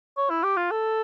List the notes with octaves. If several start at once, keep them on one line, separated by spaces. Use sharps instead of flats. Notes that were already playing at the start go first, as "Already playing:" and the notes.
C#5
E4
G4
F4
A4